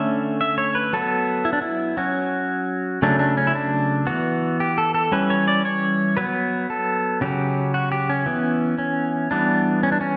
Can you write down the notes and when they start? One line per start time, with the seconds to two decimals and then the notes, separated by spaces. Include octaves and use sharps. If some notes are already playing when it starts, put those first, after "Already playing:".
Already playing: D3 A3 C#4 E5
0.41 E5
0.58 C#5
0.75 B4
0.93 F#3 B3 A4
1.45 E4
1.53 D4
1.62 E4
1.97 F#3 C#4 F#4
3.02 C#3 F#3 A3 C#4 D4
3.19 D4
3.37 C#4
3.47 E4
3.55 D4
4.07 E3 B3 F#4
4.60 G4
4.78 A4
4.94 A4
5.12 E3 G3 C#4 B4
5.30 C#5
5.48 D5
5.65 C#5
6.17 F#3 B3 B4
6.70 A4
7.21 C#3 F#3 C#4 G4
7.74 F#4
7.92 G4
8.10 C#4
8.26 E3 B3
8.78 C#4
9.31 E3 G3 B3 D4
9.83 C#4
9.92 D4
10.01 C#4